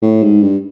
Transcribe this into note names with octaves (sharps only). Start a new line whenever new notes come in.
A2
G#2
G2